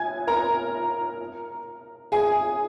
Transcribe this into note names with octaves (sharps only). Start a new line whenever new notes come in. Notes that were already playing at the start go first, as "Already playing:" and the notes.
Already playing: G#5 G#6
A#4 A#5
G#4 G#5